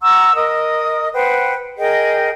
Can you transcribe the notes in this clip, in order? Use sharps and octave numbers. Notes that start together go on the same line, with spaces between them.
F#5 A#5 C#6 E6
A#4 D#5 D#6
B4 C5 F#5 G5
G#4 A#4 D#5 G5